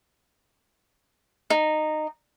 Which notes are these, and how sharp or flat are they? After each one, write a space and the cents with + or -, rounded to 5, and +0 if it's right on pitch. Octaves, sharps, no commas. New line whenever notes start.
D#4 -15